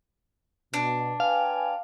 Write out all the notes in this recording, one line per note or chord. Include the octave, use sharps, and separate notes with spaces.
B2 D4
B4 F5 G5 G#5